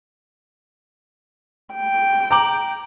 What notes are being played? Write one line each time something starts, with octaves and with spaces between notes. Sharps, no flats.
G5
A#5 D6 F#7